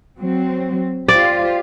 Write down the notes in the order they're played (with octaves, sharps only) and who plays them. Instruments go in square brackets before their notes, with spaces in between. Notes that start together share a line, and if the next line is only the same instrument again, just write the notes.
[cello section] F#3 C4
[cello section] F4 G4 C5 [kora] D5